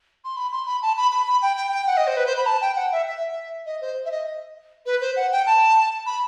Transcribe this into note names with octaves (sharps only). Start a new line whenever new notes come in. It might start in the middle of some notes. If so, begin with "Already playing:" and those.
C6
B5
C6
B5
A5
B5
B5
B5
G5
G5
G5
F#5
D#5
C5
B4
C5
B5
A5
G5
F#5
E5
E5
D#5
C5
E5
D#5
B4
C5
F#5
G5
A5
B5